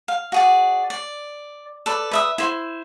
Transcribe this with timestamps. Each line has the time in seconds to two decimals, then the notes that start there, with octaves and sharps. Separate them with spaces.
0.08 F5
0.32 F#4 G#4 D5
0.90 D5
1.86 A4 B4 D5
2.11 B4 E5 D#6
2.38 E4 C5